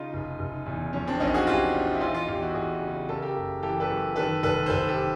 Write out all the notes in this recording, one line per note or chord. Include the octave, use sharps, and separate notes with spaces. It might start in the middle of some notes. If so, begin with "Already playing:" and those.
Already playing: C#3 D#4 F4
F1
F1
E2
F3 C#4
C4 D4
A#1 C#4 D#4
F#4 G#4
A#1 F4 G4
A#2
E4
E3 D#4 F4
D#4 F4
E2 F4 G4
E4 F#4
E2 F#4 G#4
C#3
C#3 A4
A#4
G4 A4
F#1
E3 G4 A4
A4 B4
F#2
D#3 A4 B4
F1 A4 B4
C5
F1 A4 B4
G4 A4